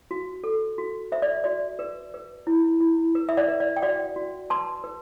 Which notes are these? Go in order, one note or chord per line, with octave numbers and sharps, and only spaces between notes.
F#4
A4
F#4
C5 E5
D5
F#4 D5
B4
B4
E4
E4
B4
E5
D5 F#5
B4
D5
G5
F#4 D5 F#5
F#4
B4 A5 C6
B4